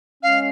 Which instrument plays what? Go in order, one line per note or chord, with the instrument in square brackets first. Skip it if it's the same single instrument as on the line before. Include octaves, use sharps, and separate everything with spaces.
[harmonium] G#3 C#4 [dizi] F5